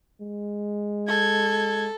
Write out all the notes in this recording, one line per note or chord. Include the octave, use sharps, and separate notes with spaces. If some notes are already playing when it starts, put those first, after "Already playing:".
G#3
A4 G#6